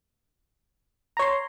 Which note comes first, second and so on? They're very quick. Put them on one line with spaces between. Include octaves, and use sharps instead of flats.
A#5 C#5 C6